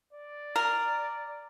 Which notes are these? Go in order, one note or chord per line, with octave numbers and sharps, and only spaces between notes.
D5
A#4